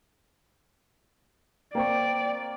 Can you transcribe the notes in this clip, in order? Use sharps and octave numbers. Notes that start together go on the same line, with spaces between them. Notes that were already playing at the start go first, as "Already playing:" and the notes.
A#3 C4 D5 G5 C#6